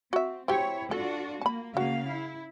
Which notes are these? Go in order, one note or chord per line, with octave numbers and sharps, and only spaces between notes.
C4 F#4 E5
C4 E4 F#4 G4 C#5
D4 F4 F#4 A4
A#3 A5 B5
C#3 A#3 F#4 F5
E4